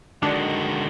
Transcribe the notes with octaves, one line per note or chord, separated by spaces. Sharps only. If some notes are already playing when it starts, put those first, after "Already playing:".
D3 D#3 G#3 D4 F#4